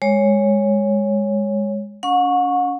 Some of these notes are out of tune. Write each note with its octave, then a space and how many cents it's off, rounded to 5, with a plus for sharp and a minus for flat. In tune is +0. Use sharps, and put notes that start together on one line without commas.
G#3 -15 C#5 +0
C#4 +35 F#5 -40 C#6 -10